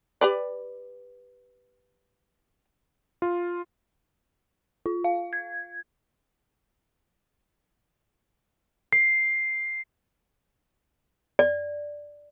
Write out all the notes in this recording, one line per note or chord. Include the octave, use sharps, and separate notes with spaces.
G4 B4 D5
F4
F4
F5
G#6
C7
D5